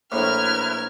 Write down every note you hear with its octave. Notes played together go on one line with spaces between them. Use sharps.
A#1 A2 E4 B4 A#5 F6 G#6